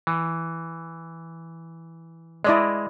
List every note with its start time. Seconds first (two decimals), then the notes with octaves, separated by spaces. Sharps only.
0.07 E3
2.44 G#3 E4 D5 D#5